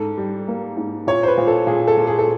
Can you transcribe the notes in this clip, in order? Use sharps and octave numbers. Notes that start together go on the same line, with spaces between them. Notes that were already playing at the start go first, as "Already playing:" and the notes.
Already playing: G#2 A4
G3
A#3
G#2
A#2 C#5
C5
B4
A#2
A4
A#2 G#4
A4
A#2
G#4
A4